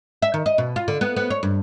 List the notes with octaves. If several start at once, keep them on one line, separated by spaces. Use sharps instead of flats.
E5
D#3
D#5
B2
F4
D3
B3
B3
C#5
G2